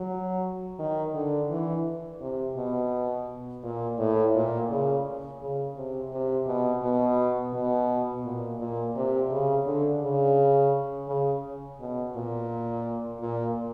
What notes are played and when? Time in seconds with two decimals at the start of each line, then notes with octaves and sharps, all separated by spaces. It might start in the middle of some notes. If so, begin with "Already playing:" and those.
Already playing: F#3
0.79 D#3
1.14 D3
1.50 E3
2.21 C3
2.57 B2
3.63 A#2
3.99 A2
4.35 A#2
4.70 C#3
5.40 C#3
5.76 C3
6.12 C3
6.46 B2
6.83 B2
7.53 B2
8.25 A#2
8.59 A#2
8.96 C3
9.30 C#3
9.66 D3
10.02 C#3
11.08 C#3
11.80 B2
12.16 A#2
13.21 A#2